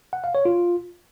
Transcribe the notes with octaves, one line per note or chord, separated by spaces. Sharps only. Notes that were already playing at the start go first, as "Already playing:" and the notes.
F#5
F5
C#5
F4